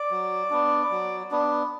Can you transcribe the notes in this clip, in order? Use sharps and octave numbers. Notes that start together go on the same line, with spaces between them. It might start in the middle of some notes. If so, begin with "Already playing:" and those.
Already playing: D5
F#3
B3 D4
F#3
B3 D4